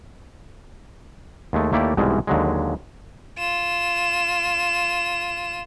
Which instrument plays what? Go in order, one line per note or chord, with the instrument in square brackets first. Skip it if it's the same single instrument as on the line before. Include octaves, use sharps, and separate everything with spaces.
[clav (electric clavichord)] D#2 G#3 A3
D#2 A3 A#3 E4 G4 D5
C2 G#2 B2 E3 G3 G#3
D#2 D3 F#3 G#3
[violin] F4 E7